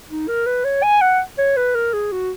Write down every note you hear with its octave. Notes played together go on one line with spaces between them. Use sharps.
D#4
A#4
B4
C#5
G#5
F#5
C#5
B4
A#4
G#4
F#4